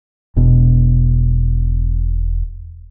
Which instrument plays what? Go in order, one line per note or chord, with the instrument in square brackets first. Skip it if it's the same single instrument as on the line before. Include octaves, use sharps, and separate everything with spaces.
[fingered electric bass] E1 B2